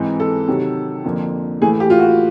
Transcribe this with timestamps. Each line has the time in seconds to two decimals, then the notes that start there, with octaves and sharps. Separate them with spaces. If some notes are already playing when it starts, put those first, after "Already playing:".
Already playing: G#2 E3 G#3 C4 D#4
0.20 A4
0.48 C3 D#3 F#3
1.04 F2 D3 F3 A#3
1.61 A2 E3 A3 G#4
1.80 G4
1.90 F4
1.99 F#4